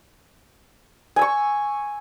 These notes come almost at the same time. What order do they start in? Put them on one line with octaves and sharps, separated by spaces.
G#5 E6 C#6